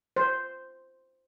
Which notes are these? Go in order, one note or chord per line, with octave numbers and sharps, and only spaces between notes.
C5